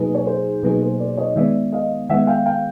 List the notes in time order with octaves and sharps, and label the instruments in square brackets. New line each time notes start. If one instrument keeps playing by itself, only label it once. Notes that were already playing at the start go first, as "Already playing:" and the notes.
Already playing: [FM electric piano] B2 F#3 A#3 D#4 G#4 [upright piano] B4
[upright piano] C#5
C5
[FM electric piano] B2 F#3 A#3 D#4 G#4 [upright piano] B4
[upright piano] C5
C5 D5
C#5 D#5
[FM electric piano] D#3 G#3 B3 [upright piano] D5 E5
[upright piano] D#5 F5
[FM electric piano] D#3 G#3 B3 [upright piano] E5 F#5
[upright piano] F5 G5
F5 G5